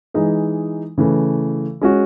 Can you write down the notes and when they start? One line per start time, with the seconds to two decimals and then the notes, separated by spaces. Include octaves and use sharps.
0.14 E3 G#3 D#4 G#4
0.98 C#3 E3 A3
1.82 G#3 C#4 F#4